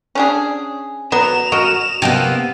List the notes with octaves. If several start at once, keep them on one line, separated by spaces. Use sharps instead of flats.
C#4 D4 G#4
F#3 B3 E7 F7
F#4 A#4 D#5
C3 A#3 B3 D#5 G5 A5